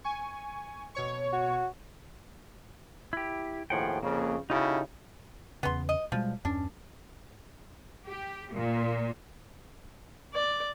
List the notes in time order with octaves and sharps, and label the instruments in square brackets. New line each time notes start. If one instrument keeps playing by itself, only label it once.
[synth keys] G#5 C#6
B2 C#5 C#6
[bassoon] F#4
[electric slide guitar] E4 G4
[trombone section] D#2 A2 F3 [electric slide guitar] G#4 F#5 G5
[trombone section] F2 C#3 [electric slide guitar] A#3
[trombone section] C#3 E4 F#4 [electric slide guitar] D#4 G4 A4
[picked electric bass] E2 C#3 [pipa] B3 C6
[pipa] D#5
[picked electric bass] B2 G3 G#3 [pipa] F3
[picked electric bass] E2 G2 C#4 [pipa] D4
[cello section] G4
A#2
[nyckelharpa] D5